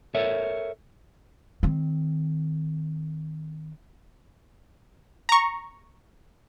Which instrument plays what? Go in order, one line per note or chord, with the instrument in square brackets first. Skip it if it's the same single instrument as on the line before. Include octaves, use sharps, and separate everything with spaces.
[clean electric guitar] A4 A#4 C#5 E5
[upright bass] D#3 C4
[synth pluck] A#5 C#6